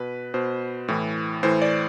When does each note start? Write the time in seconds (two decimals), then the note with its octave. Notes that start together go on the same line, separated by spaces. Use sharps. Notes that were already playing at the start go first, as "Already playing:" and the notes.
Already playing: B2 B4
0.34 B2 C5
0.88 A2 E3
1.43 A2 E3 C5
1.62 D5